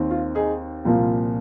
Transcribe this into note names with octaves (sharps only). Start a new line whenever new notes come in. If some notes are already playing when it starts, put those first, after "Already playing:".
Already playing: D#2 D#3 C4
F4
D#4 G#4
C2 A#2 F3 A#3